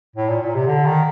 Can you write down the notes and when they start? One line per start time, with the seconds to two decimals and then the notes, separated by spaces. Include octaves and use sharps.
0.16 A2
0.29 A#2
0.42 A#2
0.55 C3
0.67 D3
0.85 D#3